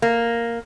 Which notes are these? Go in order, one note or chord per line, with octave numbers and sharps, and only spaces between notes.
A#3